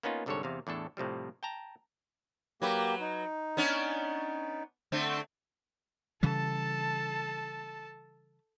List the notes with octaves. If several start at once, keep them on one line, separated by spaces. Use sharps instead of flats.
A#3 B3 C#4 D#4 F4
C2 G#2 D3 G3 A4 C#5
E2 C3 F5
E2 A2 D4 A4
A2 C3 F3 G3
G5 A5 A#5
F#3 A#3 G4 B4
D#4
B3 C#4 D4
D3 A3 C4
C#3 E3 G3 A4 A5